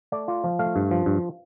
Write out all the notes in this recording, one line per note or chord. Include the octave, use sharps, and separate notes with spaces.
A3 D5
F4
F3
A3 F5
G2
F3
G2